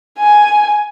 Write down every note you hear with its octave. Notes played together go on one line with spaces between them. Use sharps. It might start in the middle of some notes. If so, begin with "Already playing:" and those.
G#5